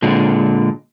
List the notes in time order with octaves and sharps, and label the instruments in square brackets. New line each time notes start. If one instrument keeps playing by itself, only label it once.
[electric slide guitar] A#2 D3 G#3